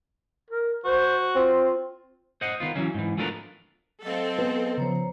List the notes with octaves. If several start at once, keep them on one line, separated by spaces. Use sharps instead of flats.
A#4
F#4 C5
C4 F4
C5 D#5 F#5
D#3 B3 F4
E3 F#3 C#4
G#2 E3
F3 A3 B3 D4 A#4
F#3 C4 A4 D#5 F5
B3
C#3 F3 C5 C#5 A#5